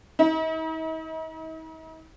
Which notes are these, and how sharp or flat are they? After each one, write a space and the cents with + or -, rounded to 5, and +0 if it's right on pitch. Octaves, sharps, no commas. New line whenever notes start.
D#4 +45